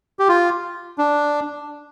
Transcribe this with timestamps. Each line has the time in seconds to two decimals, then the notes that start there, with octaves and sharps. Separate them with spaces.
0.19 G4
0.29 F4
0.98 D4